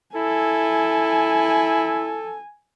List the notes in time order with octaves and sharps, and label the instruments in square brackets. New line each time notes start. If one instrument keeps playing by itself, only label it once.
[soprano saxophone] E4 [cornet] A4 [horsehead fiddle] G#5